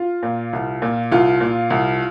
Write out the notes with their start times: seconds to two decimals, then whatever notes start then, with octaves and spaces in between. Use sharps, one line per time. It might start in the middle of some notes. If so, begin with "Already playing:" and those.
Already playing: F4
0.23 A#2
0.53 C2
0.82 A#2
1.11 C2 F4
1.41 A#2
1.70 C2